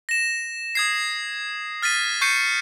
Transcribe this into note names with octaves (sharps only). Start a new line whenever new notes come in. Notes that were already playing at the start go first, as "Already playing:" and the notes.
A#6 E7
D#6 G#6 C7
F6 A6 B6 D#7
C#6 G6 C7 C#7 D#7